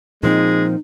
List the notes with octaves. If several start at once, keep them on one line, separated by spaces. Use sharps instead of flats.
A#2 F3 G#3 C4 D#4